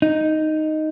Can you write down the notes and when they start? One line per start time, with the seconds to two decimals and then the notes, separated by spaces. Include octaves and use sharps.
0.02 D#4